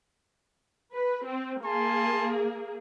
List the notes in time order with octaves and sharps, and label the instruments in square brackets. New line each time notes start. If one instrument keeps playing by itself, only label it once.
[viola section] B4
C4
[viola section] A#3 G#4 [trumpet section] G#5 A5 C6